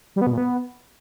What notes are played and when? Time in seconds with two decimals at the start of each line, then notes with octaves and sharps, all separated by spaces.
0.16 G3
0.21 B3
0.27 B2
0.32 A#2
0.38 B3